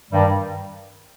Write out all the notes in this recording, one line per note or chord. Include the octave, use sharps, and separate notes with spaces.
G2 D#3 G3